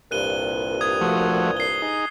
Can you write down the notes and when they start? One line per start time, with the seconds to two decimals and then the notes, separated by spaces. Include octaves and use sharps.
0.11 C2 G2 A#2 F#6 D#7 G7
0.81 D#6 G#6
1.01 F3 A3 F#4
1.57 C7 G7
1.82 D#4 G#4